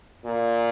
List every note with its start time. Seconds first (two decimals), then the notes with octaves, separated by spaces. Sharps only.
0.25 A#2